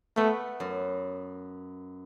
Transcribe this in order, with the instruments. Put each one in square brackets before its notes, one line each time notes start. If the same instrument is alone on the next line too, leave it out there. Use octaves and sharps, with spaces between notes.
[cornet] A3 [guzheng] B3
[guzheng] F#2